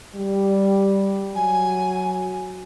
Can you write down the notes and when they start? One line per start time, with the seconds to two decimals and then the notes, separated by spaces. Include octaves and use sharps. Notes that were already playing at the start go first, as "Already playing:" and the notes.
0.16 G3
1.35 F#3 G#5